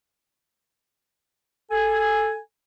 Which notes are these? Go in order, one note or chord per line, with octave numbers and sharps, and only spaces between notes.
A4 G#5